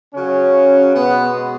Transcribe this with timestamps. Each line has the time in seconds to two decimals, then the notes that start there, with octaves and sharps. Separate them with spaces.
0.13 C#3 F#3 C#4
0.94 B2 G#3 B3